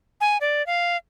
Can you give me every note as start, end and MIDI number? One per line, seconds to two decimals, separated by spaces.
0.20 0.37 80
0.41 0.65 74
0.66 0.97 77